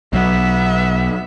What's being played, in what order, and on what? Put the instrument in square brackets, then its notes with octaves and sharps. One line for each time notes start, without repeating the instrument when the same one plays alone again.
[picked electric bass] B1 F#3 [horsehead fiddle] B3 E5